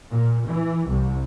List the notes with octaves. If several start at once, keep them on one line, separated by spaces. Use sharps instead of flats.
A#2
E3
C2